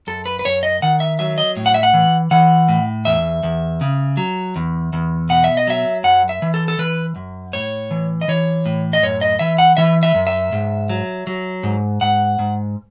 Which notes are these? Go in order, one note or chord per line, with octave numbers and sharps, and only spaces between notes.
F#2 A4
B4
B4
F#2 C#5
D#5
D#3 F#5
E5
F#3 E5
D#5
A2
F#5
E5
F#5
E3
E3 F#5
A2
E2 E5
E2
C#3
F#3
E2
E2
B2 F#5
E5
D#5
F#3 E5
F#2 F#5
E5
E3
A4
A4
E3 B4
F#2
A2 C#5
E3
D#5
E3 C#5
A2
D#5
F#2 C#5
D#5
E3 E5
F#5
E3 E5
E5
F#2
E5
G#2
F#3
F#3
G#2
G#2 F#5
G#2